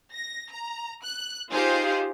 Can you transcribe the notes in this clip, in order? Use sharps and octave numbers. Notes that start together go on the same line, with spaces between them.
A#6
A#5
F#6
D#4 F4 G4 G#4 C5 F5